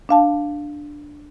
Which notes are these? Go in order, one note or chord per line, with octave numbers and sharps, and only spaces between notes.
D4 F5 A5